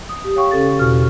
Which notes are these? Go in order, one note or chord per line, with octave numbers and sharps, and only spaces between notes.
D#6
G4
C#5 F5 G5 C#6
C#3 C#4 A4 A6
E2 B2 F#4 C#6 F6